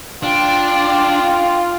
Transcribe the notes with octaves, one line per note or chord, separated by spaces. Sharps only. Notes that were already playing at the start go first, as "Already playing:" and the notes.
D4 F4 G5